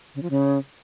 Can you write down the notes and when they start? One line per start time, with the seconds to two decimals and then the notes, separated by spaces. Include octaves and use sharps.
0.15 C#3
0.23 F3
0.30 C#3